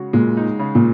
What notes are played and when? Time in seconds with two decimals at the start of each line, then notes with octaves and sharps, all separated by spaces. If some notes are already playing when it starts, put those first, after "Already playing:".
Already playing: C#3 G#3 F#4
0.13 A#2 G#3
0.37 D#4
0.59 C#3
0.75 A#2